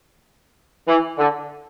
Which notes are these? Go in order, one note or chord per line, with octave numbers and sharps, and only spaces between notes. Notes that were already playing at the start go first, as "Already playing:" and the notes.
E3
D3